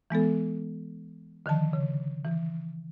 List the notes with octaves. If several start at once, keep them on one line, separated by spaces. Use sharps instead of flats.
E3 G#3 B3 A4
D3 D#3 F3 A5
C#3
E3